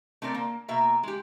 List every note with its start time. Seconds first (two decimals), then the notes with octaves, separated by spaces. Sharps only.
0.22 A3 C4 A#4 C5 D5
0.34 A#3
0.68 B2 A#3 E5 A#5
1.03 G#3 G4